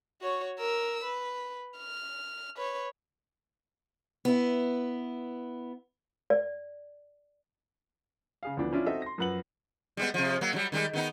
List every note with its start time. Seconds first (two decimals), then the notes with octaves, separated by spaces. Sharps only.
0.21 F#4 C#5
0.59 A#4 E6
1.04 B4
1.78 F6
2.57 B4 C#5
4.25 B3 E4
6.30 D5
8.43 C#3 G#4 F5
8.57 D2 E3 F3 B3 D4
8.72 F3 C#4 D4 E4 F4
8.86 C4 D#4 F#4 A4 D#5 E5
9.02 C6 A#6
9.18 F#2 F3 B4 F#5 F#7
9.97 G3 G#3 B3
10.14 C3 F3
10.41 F#3 A#3
10.53 D3 F#3 G3
10.72 D#3 G3 G#3
10.93 D#3 B3 D#4